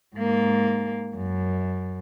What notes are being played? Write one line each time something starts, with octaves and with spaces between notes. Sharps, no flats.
G#2 A#3
F#2